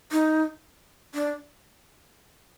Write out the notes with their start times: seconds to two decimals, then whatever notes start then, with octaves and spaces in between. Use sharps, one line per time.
0.12 D#4
1.14 D4